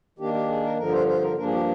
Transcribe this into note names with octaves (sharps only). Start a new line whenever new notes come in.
D#3 A#3 D4 G4
G4
G#4
A#4
G2 D3 F3 A#4
C5
C5
A#4
G2 F3 A#3 D4 A#4
G#4
G4